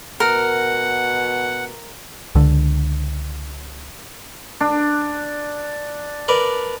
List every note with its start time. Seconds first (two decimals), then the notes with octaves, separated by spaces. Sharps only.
0.20 B2 A#4 F#5
2.35 C#2 D3
4.61 D4
6.28 A#4 B4 D5